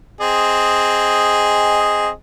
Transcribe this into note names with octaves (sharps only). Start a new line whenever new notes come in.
C4 G#4 D#5